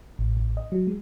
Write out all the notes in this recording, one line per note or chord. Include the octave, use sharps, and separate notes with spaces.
A1
A1
D#5
F#3
G#3